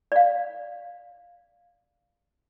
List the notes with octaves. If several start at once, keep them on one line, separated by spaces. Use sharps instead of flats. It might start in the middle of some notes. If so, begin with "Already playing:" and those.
D5 F5